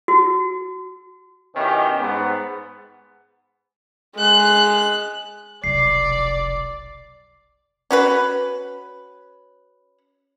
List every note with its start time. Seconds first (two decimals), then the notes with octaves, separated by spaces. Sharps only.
0.08 F#4
1.55 B2 D#3 C#4 E4 G4
2.00 G#2 B3
4.16 G#3 F#6
5.64 F1 B1 D5 C7
7.91 C#4 F#4 B4